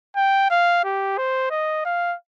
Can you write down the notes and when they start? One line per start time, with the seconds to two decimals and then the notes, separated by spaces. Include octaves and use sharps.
0.16 G5
0.50 F5
0.84 G4
1.18 C5
1.51 D#5
1.85 F5